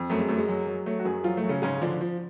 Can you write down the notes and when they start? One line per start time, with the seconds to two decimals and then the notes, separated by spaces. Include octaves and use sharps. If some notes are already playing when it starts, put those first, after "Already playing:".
Already playing: F2
0.10 F#2 A3
0.19 G#3
0.28 F#2 A3
0.38 G#3
0.48 F#3
0.67 F#3
0.86 F#3 A3
0.99 F#4
1.05 F#2 G#3 G#4
1.24 F3 F#3 F4
1.37 A3
1.43 F#3
1.49 C#3 C#4
1.62 G#2 C#3 C#4
1.81 D3 F3 D4
2.01 F3